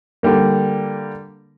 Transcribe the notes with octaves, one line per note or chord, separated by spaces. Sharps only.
D3 G3 A#3